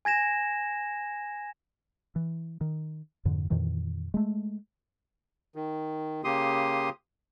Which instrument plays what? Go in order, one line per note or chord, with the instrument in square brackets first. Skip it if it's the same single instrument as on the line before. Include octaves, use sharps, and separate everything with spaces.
[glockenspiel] G#5 G#6 A#6 E7
[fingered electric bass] E3
D#3
F2 G#2 D3
F2 A#2 D#3 E3
G#3 A3
[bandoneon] D#3
C#3 A#3 G4 C6 D#6